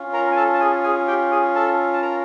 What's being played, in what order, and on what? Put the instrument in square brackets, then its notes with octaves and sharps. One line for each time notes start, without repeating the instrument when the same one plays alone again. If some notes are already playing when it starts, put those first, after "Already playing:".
Already playing: [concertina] C#4 F4
A#4 A#5
G#5
A4 A5
A5
G#4 G#5
G#4 G#5
G4 G5
G#4 G#5
A4 A5
A5
A#4 A#5